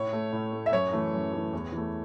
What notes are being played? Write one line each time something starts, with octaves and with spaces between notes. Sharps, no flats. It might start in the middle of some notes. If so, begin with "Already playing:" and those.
Already playing: A2 C#5
A3
A2
A3
E5
F#2 C#5
E3 A3
F#2
E3 A3
E2
E3 A3